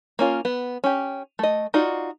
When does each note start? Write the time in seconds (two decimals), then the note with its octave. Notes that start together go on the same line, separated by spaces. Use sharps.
0.19 A#3 C#4 F4
0.45 B3
0.84 C#4 G4
1.39 A3 D#5
1.74 D#4 F4 F#4 D5